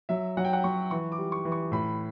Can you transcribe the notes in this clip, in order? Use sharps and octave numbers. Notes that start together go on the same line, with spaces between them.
F#3 E5
F#3 F#5
G5
F#5
F#3 C#6
E3 C#6
D6
G3
C#6
E3
C#6
A2 B5